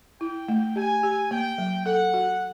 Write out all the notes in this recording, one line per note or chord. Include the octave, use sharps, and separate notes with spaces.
E4 G5
A3
G4 G#5
G4
A#3 G5
F#3
A4 F#5
F#4